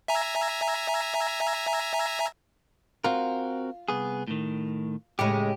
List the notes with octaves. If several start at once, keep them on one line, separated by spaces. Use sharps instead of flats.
E5 G#5 A#5
C4 F4 F#4 A#4
C2 B3 G#4
A2 D#3
A2 C#3 G#3 G4